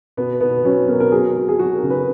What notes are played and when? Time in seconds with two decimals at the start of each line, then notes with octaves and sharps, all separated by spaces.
0.17 B2 B3
0.40 B2 B3
0.65 F#3 C#4
0.88 B2 A#4
1.00 A#4
1.12 F#3 G#4
1.36 F#3
1.49 G#4
1.59 F#3 F#4
1.75 A#4
1.83 C#3
1.90 B4